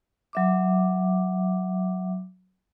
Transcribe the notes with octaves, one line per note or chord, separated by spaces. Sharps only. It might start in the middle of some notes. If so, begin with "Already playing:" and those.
F#3 E5 D6